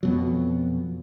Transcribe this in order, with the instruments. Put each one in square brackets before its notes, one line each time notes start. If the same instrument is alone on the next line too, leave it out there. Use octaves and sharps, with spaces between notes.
[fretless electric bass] F2 B2 F#3